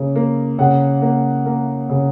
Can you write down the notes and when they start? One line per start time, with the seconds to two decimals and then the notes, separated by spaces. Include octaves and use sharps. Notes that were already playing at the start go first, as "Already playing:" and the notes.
Already playing: C#3 A#3
0.16 A#3
0.59 C#3 F#5
1.02 A#3
1.46 A#3
1.89 C#3